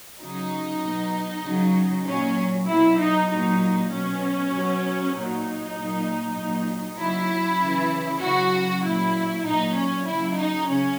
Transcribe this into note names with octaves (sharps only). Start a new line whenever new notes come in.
C#3 F#3 D#4
B2 F#3
C#3 F#3
A#2 F#3 C#4
B2 F#3 E4
D#4
A#2 F#3 D#4
B2 F#3 C#4
B2 F#3
A#2 F#3 D#4
A#2 F#3
A#2 F#3
C#3 F#3 E4
C#3 E3
C#3 F#3 F#4
A#2 F#3 E4
A#2 F#3 D#4
C#4
C#3 F#3 E4
D#4
C#3 C#4